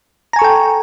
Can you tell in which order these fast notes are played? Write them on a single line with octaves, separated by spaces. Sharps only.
A#5 G#5 C#6 A4 G5